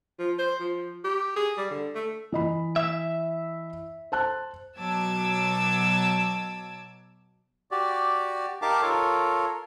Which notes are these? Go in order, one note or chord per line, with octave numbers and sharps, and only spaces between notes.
F3
C5
F3
G4
G#4
G3
D3
A3
E3 D#5 B5
E5
C5 A5 F#6
B2 F#3 A5 D6 E6 G#6
F#4 G4 D5
D#4 G4 A#4 F5 A5 D6
F4 A4 A#4 C#5